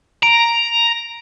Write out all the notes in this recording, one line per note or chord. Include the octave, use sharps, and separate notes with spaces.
A#5 D7